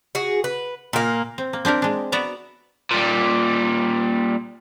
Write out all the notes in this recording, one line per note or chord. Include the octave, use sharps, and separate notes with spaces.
F#4 G#4
B4
A#2 A#3
C4
A#3
C4 D4 G4 A#4
G#3 D4
B3 F#4 D5 E5 A#5
A#2 G3